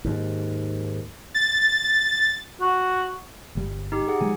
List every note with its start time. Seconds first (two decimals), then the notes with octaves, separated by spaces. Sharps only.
0.05 D#2 G#2
1.34 A6
2.61 F#4
3.55 G1 G3
3.92 D#4 G4
4.08 G#4 F#5
4.21 F3 G#3 G#5